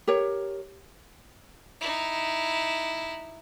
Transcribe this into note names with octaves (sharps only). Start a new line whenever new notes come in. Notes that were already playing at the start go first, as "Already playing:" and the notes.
G4 A#4 C#5
D#4 E4